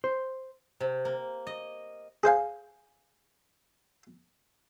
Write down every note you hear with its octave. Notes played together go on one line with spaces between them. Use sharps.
C5
C3
A#3
D#5
G#4 C5 F5 G#5